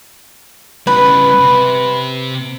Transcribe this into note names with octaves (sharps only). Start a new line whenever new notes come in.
C#3 G3 B4
C3